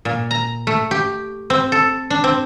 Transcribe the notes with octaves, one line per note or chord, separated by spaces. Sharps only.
A#2
A#5
A3
G4
C4
A4
D4
C4